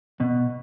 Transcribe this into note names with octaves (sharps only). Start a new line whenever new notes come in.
B2